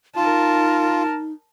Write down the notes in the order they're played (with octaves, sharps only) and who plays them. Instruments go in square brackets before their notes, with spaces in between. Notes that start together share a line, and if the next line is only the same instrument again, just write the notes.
[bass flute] D#4 [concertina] F4 [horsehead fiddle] A#4 A5